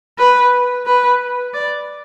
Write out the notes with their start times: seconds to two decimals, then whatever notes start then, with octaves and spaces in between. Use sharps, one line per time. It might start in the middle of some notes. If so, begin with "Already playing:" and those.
0.19 B4
0.86 B4
1.54 D5